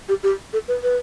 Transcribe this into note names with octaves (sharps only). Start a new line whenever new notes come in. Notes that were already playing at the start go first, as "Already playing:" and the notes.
G4
G4
A4
B4
B4